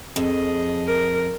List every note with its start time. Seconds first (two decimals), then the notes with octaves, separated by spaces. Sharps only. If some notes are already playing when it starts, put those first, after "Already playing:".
0.16 F2 G#4 D#5
0.87 A#4